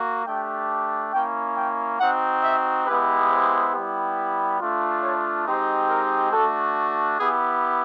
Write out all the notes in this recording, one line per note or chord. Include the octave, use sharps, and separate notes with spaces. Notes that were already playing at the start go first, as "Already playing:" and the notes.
Already playing: A#3 F#4
A3 D4 G4 G5
A#3 C#4 E4 G5
G5
C4 D#4 F#4 F#5
E5
G#3 B3 E4 G4 B4
C5
G3 B3 E4 G4
A3 D4 F4
C#5
G#3 C4 D#4 G4 C5
A#4
A3 D4 F#4 A4
B3 E4 G4 G#4